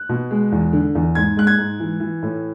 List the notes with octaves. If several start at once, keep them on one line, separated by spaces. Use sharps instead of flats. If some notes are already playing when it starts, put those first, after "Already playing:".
Already playing: F#6
B2
G#3
E2
D3
E2
G#2 G#6
G#3 F#6
G#6
G#2
E3
E3
A2